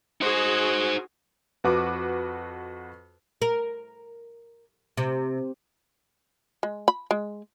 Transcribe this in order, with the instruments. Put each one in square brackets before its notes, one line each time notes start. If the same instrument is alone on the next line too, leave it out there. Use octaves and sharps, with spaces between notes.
[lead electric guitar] D#4 C5 [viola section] F#4 G#4
[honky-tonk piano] F2 F#4 B4 D6
[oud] A#4
C3
[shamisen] G#3
B5
G#3